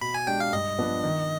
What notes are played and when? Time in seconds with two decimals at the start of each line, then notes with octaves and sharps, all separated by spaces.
0.01 B2 B5
0.14 G#5
0.27 G#3 D4 G4 G5
0.40 F5
0.53 G2 D#5
0.78 F3 B3 D4
1.04 D#3